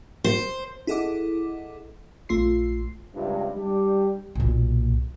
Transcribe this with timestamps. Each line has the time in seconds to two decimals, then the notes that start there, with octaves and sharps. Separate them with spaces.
0.24 C5
0.87 E4 G#4 A4 D#5 F#5 D6
2.29 A#1 A3 F4 C6 C7
3.15 C#2 G2 C3
3.56 G3 D4 G4
4.35 B1 A#2